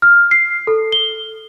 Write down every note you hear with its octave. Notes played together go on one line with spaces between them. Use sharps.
F6
C7
A4
G7